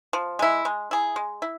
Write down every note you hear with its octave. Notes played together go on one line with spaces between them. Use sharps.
F3
G#3 E4
G#3
E4 G#4
G#3
E4